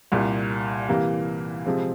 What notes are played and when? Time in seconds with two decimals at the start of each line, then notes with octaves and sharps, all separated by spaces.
0.12 C2 A#2 G3
0.89 C3 E3 G3 A#3
1.66 C3 F3 G#3 C4